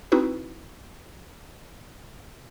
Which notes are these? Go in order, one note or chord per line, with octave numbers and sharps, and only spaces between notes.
C4 D#4 E4 F#4 B4